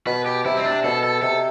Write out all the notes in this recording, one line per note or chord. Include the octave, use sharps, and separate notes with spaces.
B2 B4
G4
C3 E4
C4
D4
B2 A4
A4
C3 A4